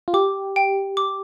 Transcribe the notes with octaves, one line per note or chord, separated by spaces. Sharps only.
F4
G4 D6
G5
D6